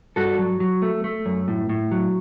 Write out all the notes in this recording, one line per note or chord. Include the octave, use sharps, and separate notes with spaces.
G2 F#4 A4
F#3
F#3
A3
A3
F#2
A2
A2
F#3